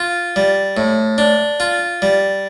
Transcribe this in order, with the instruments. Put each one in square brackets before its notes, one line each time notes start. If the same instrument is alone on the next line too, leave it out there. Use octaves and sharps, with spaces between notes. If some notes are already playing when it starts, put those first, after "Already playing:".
Already playing: [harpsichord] F4
G3
A2
D4
F4
G3